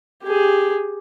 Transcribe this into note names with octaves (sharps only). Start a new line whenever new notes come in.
G4 G#4